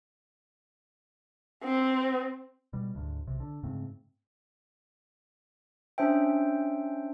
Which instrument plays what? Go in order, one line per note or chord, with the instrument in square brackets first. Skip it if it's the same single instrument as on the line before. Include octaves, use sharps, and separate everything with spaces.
[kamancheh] C4
[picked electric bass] B2 G3
D2 G#2
B1 C3
D3
G#2 C#3 A3 C4
[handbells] C#4 D4 C5 E5 G5